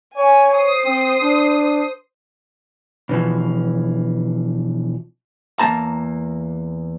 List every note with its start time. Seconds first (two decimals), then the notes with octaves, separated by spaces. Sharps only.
0.17 C#5 G#5
0.54 C5 D#6 C7
0.85 C4
1.22 D4
3.09 B2 E3 F3
5.59 E2 A#3 A5 A#5